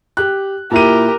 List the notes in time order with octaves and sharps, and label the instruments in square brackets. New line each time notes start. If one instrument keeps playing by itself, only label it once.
[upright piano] G4 F#6
[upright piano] A#2 E4 D#7 [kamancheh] G4 A#4